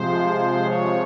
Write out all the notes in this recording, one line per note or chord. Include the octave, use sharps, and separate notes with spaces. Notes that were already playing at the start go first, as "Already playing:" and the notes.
Already playing: C3 F3 G#3 C5
C#5